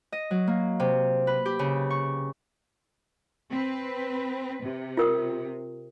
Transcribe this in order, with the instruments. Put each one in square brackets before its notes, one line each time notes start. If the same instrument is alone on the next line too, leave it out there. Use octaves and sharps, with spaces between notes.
[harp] D#5
F#3
A#3
C3
B4
G4
C#3
C#6
[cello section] C4 B4
C3
[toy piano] F4 A#4 D#6